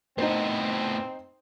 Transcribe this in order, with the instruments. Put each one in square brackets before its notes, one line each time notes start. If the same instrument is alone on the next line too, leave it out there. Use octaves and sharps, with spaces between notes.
[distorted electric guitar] A2 B3 [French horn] C4 [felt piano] D#4 C5